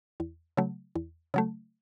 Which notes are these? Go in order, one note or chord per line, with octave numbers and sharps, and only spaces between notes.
E2
C#3 F#3 A3
E2
C#3 F#3 A3